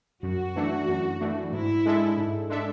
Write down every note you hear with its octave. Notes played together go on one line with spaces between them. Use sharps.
F#2 F#4
E3 A3 D4
F#2
E3 A3 D4
G#2 E4
G#3 D4 A4 E5
G#2
G#3 D4 A4 E5